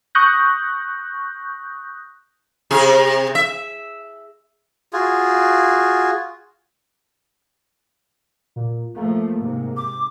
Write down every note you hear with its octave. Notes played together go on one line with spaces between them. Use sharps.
C#6 D#6 F#6 G6 A#6
C3 G#4
E5
F4 F#4 G#4
A#2
F3 A3 A#3
G#2 C3
D6